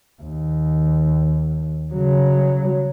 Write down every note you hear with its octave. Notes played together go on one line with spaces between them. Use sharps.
D#2
C#3 F#3